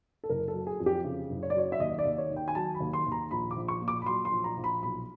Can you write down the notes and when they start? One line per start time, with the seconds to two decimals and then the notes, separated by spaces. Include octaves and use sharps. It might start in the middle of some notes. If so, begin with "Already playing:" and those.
0.24 A4
0.29 F#1 A#4
0.48 A4
0.54 F#3
0.67 G#4
0.80 F2
0.86 G4
1.04 C#3
1.30 F#1
1.43 C#5
1.50 D5
1.55 F#3 C#5
1.72 E5
1.79 D#2 D#5
1.99 D5
2.05 D#2
2.18 C#5
2.30 D#3
2.36 G5
2.48 G#5
2.55 F#3 A5
2.75 B5
2.80 D#2
2.93 C6
3.06 D#2
3.12 A#5
3.31 A#1 B5
3.51 D6
3.56 A#1
3.68 C#6
3.82 A#2
3.88 D6
4.02 B5
4.06 F#3 C6
4.25 C6
4.31 A#1
4.44 A#5
4.57 A#1
4.64 B5
4.82 B1 B5